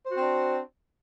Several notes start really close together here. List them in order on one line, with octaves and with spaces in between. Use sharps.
C5 F#4 C4 D4